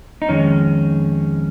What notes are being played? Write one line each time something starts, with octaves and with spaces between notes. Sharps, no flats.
D#4
F2 D#3 G#3 C#4